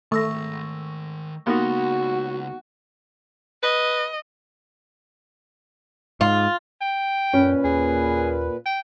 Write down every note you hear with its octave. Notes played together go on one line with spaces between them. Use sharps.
D#3 A3 G#4 C#6 E6 A#6
C#2 A#3 B3 D#4 F#4 G4 C6
B4 D#5
G#2 F4
G5
F#2 A#2 C#4 B4
D#2 G#4
G5